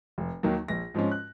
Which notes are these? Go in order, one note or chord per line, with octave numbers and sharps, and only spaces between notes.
F1
D#2 D#3 F#3 A#3
A#1 A#6
G#2 F3 G#3 C#4
F#6